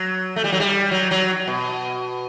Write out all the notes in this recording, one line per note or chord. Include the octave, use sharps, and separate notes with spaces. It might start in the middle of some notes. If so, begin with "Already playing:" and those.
Already playing: F#3
A3
G3
F#3
G3
F#3
F#3
B2